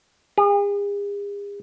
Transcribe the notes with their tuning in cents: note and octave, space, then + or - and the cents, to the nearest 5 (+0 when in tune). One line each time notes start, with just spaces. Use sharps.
G#4 -45